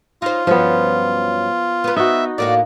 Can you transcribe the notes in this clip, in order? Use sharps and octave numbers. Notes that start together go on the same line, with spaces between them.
D#4 F4 C5
G2 F3 F#3 B3 C#4
B3 B4
D#4 F#4 E5
A2 A#3 F#4 D5